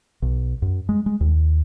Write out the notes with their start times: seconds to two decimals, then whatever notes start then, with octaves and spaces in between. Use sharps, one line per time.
0.22 B1
0.62 F#2
0.89 G#3
1.06 G#3
1.21 D#2